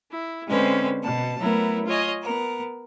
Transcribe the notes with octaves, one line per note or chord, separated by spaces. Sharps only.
E4
D3 G#3 C4 C#4 B4 C5
B2 A5
F#3 A3 B3 E4 A#4
F4 C#5 D#5 G#5
B3 A#4